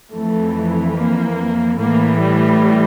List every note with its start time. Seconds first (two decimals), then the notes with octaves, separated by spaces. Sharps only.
0.12 F2 E3 A3
0.95 A#3
1.78 A2 E3 A#3
2.20 G3